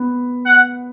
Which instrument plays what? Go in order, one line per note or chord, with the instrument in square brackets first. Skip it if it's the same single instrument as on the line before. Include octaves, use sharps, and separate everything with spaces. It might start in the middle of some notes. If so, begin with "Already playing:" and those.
Already playing: [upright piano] B3
[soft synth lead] F#5